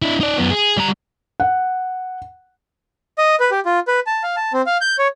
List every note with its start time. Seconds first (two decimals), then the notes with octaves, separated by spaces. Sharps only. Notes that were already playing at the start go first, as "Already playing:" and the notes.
0.02 D4 E4
0.21 D#4 D5
0.38 F#2 B3
0.51 G#4
0.77 G3 A#5
1.40 F#5
3.18 D#5
3.40 B4
3.51 G4
3.66 F4
3.88 B4
4.07 A5
4.23 F5
4.36 A5
4.53 C4
4.66 F5
4.81 G6
4.98 C#5